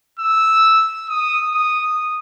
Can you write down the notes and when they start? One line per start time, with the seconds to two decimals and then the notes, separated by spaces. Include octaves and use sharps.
0.19 E6
1.09 D#6
1.55 D#6